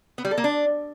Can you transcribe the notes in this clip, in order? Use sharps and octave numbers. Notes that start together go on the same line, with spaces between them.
B3
G3
A4
A#3
D4